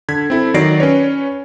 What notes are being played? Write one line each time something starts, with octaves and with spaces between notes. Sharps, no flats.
D3 G#6 B6
C4 E4 A4
D#3 F#3 D5 A#6 C7 D7
C#4 B4 C#5